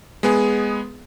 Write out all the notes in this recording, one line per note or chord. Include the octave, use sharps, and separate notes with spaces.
G#3 B3 G#4